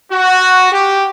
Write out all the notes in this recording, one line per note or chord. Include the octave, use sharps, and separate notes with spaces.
F#4
G4